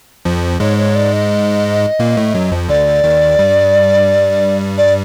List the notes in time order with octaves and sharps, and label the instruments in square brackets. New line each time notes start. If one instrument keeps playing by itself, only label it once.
[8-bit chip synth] F2 F3
[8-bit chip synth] G#2 G#3 [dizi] C#5
[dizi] C#5
D5
D#5
[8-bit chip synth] A#2 A#3
A2 A3
F#2 F#3
F2 F3
[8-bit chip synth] D2 D3 [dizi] D5
[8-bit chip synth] D#2 D#3
G2 G3
[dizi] D5